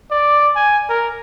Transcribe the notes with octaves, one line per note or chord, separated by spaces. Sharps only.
D5
G#5
A#4